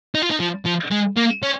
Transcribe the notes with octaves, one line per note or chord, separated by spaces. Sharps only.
D#4
F4
D#4
F3
F3
G#3
A#3
C#4